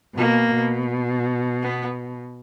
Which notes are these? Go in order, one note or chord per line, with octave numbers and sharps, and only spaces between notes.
B2 A#3
B2
B3